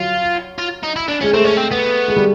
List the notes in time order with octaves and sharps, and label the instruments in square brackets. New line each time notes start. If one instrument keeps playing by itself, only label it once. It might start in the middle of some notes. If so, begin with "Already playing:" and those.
Already playing: [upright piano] F#3 [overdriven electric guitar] F4
[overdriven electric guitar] F4
D#4
E4
D4
[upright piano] G#3 [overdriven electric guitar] C#4
[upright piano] A3 [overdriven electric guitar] C4
[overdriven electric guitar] C#4
C4
B3
[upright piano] G#3
G3